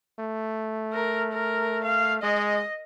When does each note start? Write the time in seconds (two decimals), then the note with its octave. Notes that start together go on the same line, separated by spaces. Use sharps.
0.19 A3
0.93 A#4
1.33 A#4
1.84 F5
2.23 G#3 D#5